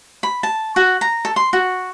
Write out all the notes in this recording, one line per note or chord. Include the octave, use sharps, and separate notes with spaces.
B5
A5
F#4
A#5
A4
C6
F#4